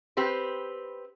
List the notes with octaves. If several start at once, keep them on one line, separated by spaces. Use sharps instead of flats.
C4 G4 B4